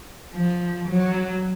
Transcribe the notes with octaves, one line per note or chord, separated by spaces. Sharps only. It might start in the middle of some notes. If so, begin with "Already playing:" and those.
F3
F#3